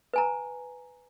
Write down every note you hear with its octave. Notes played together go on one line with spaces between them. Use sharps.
B4 G#5 A#5